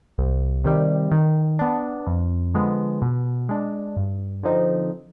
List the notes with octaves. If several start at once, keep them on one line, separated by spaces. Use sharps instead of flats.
C2
C3 D#3 G3
D#3
B3 D4
F2
D3 F3 G#3 B3
B2
G#3 D4
G2
D3 F3 C4 D#4